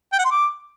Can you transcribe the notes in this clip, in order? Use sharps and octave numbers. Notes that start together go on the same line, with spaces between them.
G5
F#5
C6
D6